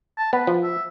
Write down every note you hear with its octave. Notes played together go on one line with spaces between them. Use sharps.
A5
B3 B4
F3
E5